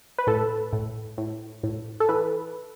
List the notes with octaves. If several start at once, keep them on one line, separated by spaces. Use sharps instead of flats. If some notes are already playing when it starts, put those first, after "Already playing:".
B4
A2 A4
A2
A2
A2
A4
E3 B4